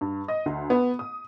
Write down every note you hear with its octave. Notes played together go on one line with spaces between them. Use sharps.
G2
D#5
D2
B3
D#6